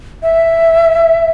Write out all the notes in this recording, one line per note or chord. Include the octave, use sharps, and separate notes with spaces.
E5